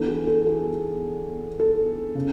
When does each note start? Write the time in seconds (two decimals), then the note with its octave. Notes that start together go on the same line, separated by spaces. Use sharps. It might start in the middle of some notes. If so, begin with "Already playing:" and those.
Already playing: E3 B3 D4 A4
0.08 G#4
0.27 A4
0.47 G#4
1.59 A4
2.15 C#3